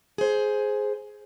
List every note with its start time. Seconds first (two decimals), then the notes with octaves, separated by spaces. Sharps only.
0.18 G#4 C5